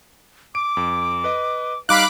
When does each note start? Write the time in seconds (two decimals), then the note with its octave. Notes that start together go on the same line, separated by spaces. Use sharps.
0.55 D6 D7
0.77 F2
1.24 B4 D#5
1.89 G3 D#4 F5 B5 D6 F#6